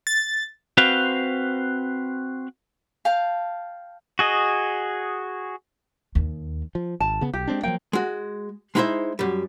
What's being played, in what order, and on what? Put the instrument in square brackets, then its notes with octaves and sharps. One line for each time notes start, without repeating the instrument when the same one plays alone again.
[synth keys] A6
[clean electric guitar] C4 F#4 B4 C5 F5
[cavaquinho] F5 G5 A5
[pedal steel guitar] F#4 G#4 D#5
[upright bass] D#2
[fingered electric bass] F3
[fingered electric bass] G#1 [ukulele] A5
[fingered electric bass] C#3 B3
[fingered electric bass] B1 [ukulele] G4
[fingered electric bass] G#3 C4 D4
[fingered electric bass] F3 F#3 A#3 [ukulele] G5
[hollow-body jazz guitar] G#3 F#4
G#3 D#4 E4 B4 C5 E5
F#2 G3